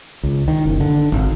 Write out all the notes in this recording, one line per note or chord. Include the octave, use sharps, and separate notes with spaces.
C#2
D#3
F#1
D3
G#1